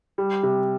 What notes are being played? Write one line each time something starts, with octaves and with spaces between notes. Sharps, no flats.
G3
C3